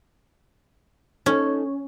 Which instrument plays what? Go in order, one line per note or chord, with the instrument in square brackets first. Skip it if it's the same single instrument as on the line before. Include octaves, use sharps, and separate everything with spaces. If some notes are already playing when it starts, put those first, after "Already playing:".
[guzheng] C#4 [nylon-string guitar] D#4 A4